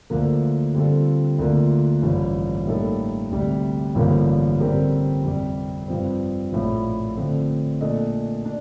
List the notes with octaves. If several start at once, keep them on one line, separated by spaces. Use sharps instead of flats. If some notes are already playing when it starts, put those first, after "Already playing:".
D2 D3 F3 A#3
D3 G3 C4 F4 A4
D2 D3 F3 A#3 F4
A1 G2 F3
A2 G3 A#3 D#4 A4
D2 C3 G3
A1 G2 D3 F3 A#3
D3 G3 C4 G4 A#4
F2 C3 G3
G2 F3 C4
A#1 A2 F3
D3 F3 A3 C4
A#2 A3 D4 A4 D#5
D4